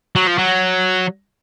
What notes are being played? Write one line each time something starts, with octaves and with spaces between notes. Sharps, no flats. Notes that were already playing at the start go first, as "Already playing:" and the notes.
F#3
F3
F#3